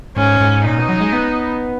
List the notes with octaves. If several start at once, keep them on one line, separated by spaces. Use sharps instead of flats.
G#2 C#4
G#2
A#2 D#4
B2
F#3
G#3
B3